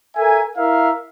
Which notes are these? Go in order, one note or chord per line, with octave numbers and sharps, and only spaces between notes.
A4 A#4 E5 G#5
E4 A#4 E5 F5